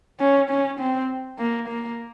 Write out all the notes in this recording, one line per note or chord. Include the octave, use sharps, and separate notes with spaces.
C#4
C#4
C4
A#3
A#3